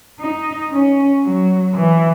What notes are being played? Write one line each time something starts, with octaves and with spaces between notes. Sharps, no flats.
D#4
C#4
F#3
E3